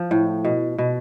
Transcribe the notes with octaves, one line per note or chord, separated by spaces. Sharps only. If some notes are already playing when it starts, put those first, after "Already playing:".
Already playing: F3
A2
B2
B2